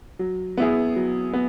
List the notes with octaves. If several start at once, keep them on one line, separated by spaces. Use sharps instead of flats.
F#3
B3 E4 G#4
F#3
B3